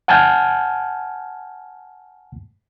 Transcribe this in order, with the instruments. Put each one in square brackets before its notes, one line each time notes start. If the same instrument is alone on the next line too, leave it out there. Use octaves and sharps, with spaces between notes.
[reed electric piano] F#5 G#5 A5 F6 G6